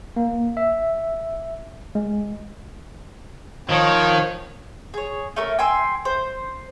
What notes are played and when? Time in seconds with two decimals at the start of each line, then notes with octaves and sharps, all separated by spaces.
0.16 A#3
0.57 E5
1.95 G#3
3.69 D#3 F3 C#5
4.94 G#4 C#5
5.36 A3 C#4 A#4
5.59 G5 G#5 C6 E6
6.05 C5